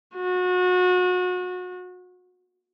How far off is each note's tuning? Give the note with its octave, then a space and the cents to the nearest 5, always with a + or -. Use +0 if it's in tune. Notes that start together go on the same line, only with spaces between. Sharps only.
F#4 -30